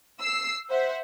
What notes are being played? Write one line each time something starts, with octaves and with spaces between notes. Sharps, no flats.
E6 C7
C5 E5 F#5